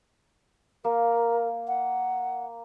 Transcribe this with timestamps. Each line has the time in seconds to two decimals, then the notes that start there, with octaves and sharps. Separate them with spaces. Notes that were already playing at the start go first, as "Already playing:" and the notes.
0.85 A#3 A#4
1.68 F#5